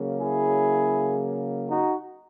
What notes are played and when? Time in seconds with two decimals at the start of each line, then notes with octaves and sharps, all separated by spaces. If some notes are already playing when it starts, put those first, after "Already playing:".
Already playing: C#3 F#3 A#3
0.18 E4 G#4
1.68 D#4 F#4